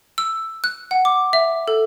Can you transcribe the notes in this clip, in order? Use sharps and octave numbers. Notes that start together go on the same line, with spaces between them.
E6
F#6
F#5
D6
E5
A4